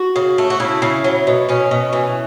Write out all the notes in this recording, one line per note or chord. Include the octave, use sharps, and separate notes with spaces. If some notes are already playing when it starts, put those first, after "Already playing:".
Already playing: F#4
C#3
A3
F#4
C#3 E4
C#3
F#3
B2
B2 C#4
B2
E3